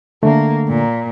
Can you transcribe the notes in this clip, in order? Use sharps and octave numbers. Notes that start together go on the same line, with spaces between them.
D3 A3 A#3
A#2